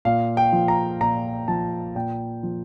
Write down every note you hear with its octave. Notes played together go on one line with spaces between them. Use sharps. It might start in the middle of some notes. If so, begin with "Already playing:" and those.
A#2 F5
G5
F3
A#5
A#2 A#5
F3 A5
A#2 G5
F3